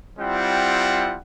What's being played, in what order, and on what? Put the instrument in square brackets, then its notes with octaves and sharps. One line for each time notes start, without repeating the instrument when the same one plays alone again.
[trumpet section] G3 C4 E4 F4 F#5